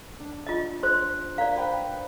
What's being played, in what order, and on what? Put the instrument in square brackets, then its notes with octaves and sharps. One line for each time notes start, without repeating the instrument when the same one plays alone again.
[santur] D4
[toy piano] F4 D#5
C5 C6
[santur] A#4 [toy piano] D5 F5
[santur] B4 C5 G5